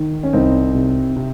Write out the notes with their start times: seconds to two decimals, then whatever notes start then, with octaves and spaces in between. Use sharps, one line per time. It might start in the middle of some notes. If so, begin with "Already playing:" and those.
Already playing: D#3
0.23 C#4
0.33 C2 C4 D#4
0.75 C3
1.16 C3